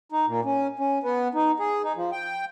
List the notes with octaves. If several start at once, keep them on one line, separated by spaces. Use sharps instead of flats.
D#4
A#2
C#4
C#4
B3
D#4
G#4
D#4
F3
G5